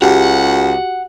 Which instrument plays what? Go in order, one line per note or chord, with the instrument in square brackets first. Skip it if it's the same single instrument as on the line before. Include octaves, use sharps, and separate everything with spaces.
[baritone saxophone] C#2 [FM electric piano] F#4 G4 [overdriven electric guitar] F#5